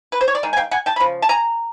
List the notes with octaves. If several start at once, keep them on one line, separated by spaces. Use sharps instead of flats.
B4
C5
C#5
D5
D#3 G#3
G#5
F5 G5
F#5 G#5
G5 A5
B5
C#3 F3
A5
G#5 A#5